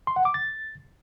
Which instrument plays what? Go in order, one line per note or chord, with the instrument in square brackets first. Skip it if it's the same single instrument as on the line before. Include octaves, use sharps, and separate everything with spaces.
[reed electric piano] C6
F#5
D6
A6